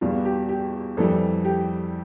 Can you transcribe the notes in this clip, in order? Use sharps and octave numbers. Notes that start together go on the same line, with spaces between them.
E2 B2 G3 F4
G4
G4
F2 E3 G3 A4
G4